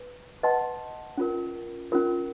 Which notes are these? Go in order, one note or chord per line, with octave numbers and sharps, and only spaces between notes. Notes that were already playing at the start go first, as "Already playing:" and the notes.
Already playing: B4
B4 D#5 F#5 A5 C6
C#4 F4 A#4
C#4 F4 A#4